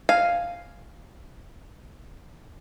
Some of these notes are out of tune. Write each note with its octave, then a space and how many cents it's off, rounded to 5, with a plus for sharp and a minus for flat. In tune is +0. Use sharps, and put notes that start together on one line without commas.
F5 +0 G#5 +0